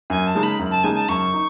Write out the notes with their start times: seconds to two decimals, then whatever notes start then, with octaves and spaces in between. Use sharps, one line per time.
0.10 F#2 G#5
0.27 A5
0.35 C#3 G#3 D#4
0.43 B5
0.59 F#2
0.71 A5
0.84 C#3 G#3 D#4 G#5
0.97 A5
1.09 F#2 C#6
1.33 D#4